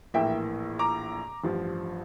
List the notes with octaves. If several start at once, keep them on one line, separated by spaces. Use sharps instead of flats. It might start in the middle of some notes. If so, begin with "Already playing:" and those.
A#1 A2 E3 A#3 E5 G5
A#5 D6
A1 G2 F3